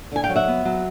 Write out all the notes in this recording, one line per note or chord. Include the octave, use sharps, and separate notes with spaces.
D3 G#5
F5 G5
F#3
E5 F#5
B3
F#3